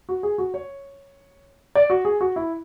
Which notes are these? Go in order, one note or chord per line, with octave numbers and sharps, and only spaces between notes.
F#4
G#4
F#4
C#5
D5
F#4
G#4
F#4
E4